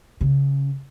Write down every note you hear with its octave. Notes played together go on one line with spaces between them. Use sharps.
C#3